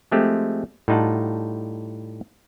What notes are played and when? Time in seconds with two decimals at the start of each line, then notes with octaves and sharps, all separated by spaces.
0.11 F3 G#3 A3 C4 G4
0.88 A2 G3 D#4 F4 F#5 A5